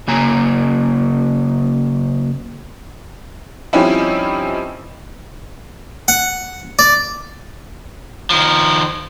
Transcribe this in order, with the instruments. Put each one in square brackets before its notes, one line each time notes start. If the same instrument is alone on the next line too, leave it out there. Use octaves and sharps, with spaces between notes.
[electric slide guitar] C#3 F#3 A#3 G#5 A#5
[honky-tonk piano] F3 G3 C4 C#4 D#4 E4
[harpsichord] F#5
D5
[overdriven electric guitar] D#3 F3